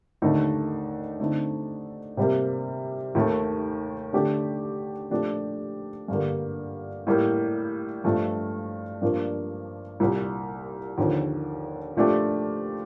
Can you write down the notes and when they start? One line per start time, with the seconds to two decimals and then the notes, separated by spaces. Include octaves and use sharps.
0.22 D#2 D3 A3 D#4
1.20 D3 A3 C4 D#4
2.17 C3 G3 A#3
3.15 D#2 D#3 A3
4.13 D3 A3 D4 G4
5.11 A#2 F3 A3 D4 G4
6.08 G2 D3 G3 A#3
7.07 A2 G3 A#3
8.04 G2 F3 A3
9.02 G2 F3 A#3 D4
10.00 C2 A#2 G3
10.98 D#2 D3 F3
11.95 A#2 F3 A3 D4 G4